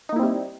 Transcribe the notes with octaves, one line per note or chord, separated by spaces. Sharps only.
G3 A#3 C4 D#4 E4